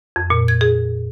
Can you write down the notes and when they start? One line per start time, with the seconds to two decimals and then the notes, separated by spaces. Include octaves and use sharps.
0.16 F2
0.30 A#2
0.48 G#6
0.61 G#4